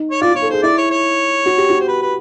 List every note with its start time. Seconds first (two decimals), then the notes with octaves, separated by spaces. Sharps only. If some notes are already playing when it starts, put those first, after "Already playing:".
Already playing: D#4
0.11 C#5
0.21 F4 D5
0.32 F4
0.36 C#5
0.42 A4
0.49 G#4 C5
0.63 E4 D5
0.78 C#5
0.90 C#5
1.46 F#4
1.57 G4
1.70 F#4
1.80 C5
1.88 B4
2.02 B4